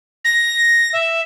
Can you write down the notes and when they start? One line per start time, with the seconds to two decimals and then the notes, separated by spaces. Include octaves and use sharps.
0.25 A#6
0.93 E5